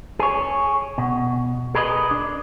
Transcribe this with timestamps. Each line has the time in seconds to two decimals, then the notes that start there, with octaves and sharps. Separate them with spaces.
0.19 G#4 C#5
0.98 B2
1.75 G#4 A#4 B4 C#5 D#5
2.11 D4